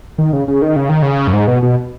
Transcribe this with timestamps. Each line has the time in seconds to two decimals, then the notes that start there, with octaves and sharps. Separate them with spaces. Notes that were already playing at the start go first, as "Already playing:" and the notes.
0.18 D#3
0.33 C#3
0.48 C#3
0.62 D#3
0.76 C#3
0.89 D#3
1.02 C#3
1.27 F#2
1.33 G#2
1.48 B2
1.63 B2